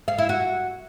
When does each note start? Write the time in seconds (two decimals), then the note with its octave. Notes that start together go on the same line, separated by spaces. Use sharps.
0.08 F5
0.18 E4
0.29 F#4